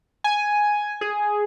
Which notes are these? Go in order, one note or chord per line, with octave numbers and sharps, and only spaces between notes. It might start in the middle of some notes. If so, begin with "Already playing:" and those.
G#5
G#4